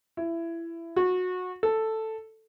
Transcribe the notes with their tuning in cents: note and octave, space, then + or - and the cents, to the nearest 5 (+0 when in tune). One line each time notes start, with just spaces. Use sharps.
E4 +20
F#4 -20
A4 +5